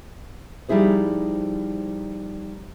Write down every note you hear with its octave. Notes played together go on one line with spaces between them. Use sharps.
F3 G3 D#4 E4 G#4 C5